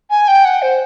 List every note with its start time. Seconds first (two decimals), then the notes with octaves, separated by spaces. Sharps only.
0.10 G#5
0.28 G5
0.45 F#5
0.62 C5